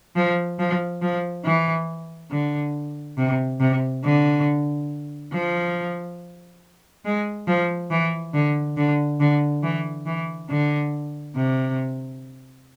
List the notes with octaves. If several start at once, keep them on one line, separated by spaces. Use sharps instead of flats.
F3
F3
F3
E3
D3
C3
C3
D3
F3
G#3
F3
E3
D3
D3
D3
E3
E3
D3
C3